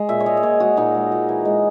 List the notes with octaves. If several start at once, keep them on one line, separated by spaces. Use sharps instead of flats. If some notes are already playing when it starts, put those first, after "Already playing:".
Already playing: G#3
A#2 E5
C#5
G#3 D#5
D#5
A#2 C#5
G#3 F#4
A#2 D#4
G#3
A#2
E3
G#3